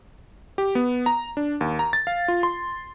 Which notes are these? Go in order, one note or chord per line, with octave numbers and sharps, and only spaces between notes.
G4
B3
A#5
D4
D#2
A#5
A6
F5
F4
C6